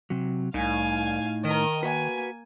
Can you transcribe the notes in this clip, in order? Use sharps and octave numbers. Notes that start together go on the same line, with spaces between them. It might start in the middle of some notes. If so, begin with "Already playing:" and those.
C3 F#3
C2 A2 D#4 F5 G#5
D#3 A#4 D#5
A#3 F#4 B4 G#5